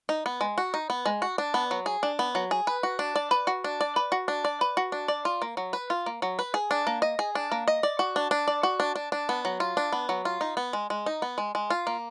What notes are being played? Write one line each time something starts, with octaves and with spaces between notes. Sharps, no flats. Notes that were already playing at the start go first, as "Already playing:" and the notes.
D#4
B3
G#3
F#4
D#4
B3
G#3
F#4
D4
B3
F#3
G#4
D4
B3
F#3
G#4
B4
F#4
D4
D5
B4
F#4
D4
D5
B4
F#4
D4
D5
B4
F#4
D4
D5
F4
A#3
F#3
B4
F4
A#3
F#3
B4
G#4
D4
A#3
D#5
G#4
D4
A#3
D#5
D5
F#4
D4
D4
D5
F#4
D4
D4
D4
B3
F#3
F4
D4
B3
F#3
F4
D#4
B3
G#3
G#3
D#4
B3
G#3
G#3
F4
A#3